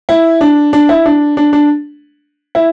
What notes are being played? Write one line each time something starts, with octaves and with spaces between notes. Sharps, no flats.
E4
D4
D4
E4
D4
D4
D4
E4